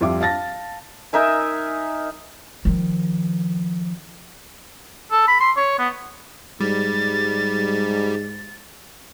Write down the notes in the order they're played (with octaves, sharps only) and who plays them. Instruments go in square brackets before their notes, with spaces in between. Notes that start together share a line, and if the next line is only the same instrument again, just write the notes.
[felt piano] F2 G3 F4 E5 D6
F5 A5 A6 A#6
[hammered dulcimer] D#4 A#4 E5 G#5
[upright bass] D#3 F3
[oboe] A4
B5
C6
C#5
B3
[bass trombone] G#2 [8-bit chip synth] G3 [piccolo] A6